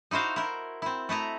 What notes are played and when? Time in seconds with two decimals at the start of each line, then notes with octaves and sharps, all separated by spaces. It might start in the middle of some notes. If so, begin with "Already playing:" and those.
0.11 D#4 E4 F#4 C5 F5
0.36 E4 A#4
0.82 C4 E4
1.09 A3 E4 D#5 A#5